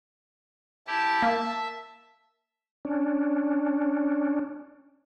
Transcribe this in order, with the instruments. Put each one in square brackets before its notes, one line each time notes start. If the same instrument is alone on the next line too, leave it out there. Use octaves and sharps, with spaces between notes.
[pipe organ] E4 G4 [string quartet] A5
[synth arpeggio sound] A#3 [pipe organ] E5
[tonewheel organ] C#4 D4